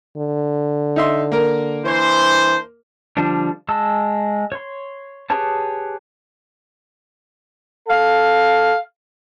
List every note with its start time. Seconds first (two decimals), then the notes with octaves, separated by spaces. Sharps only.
0.17 D3
0.96 D#4 E5 C6
1.32 A#3 A#4
1.85 E3 D4 C5
3.17 D3 F3 G3 D4
3.69 G#3 A5 E6
4.52 C#5 C6
5.30 G4 G#4 B4 C#5 A5
7.88 A4 F5